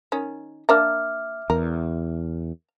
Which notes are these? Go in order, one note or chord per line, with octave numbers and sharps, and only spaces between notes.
D#3 C#4
A#3 D4 A#4 E5 D6 F6
E2 A#4